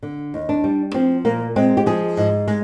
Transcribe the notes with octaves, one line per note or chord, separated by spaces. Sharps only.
D3
D#2
D4
G3
F3 C4
A#2 A#3
G#3 C4
G4
F3 G#4
G#2
G#3